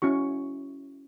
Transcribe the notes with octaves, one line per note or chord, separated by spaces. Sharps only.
C#4 E4 F#4 C#6